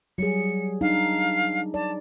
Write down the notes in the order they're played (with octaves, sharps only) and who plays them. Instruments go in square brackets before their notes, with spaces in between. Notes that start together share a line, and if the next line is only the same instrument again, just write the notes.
[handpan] F#3 G3 G#4 [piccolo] C#7
[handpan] D4 D#4 [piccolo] F5
[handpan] D5 [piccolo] A5